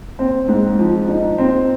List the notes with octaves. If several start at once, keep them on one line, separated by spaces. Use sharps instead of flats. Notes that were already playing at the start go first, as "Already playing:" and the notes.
C4
G#2
F3
D#4
C4